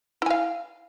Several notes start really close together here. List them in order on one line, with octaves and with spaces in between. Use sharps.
E4 G#5 F5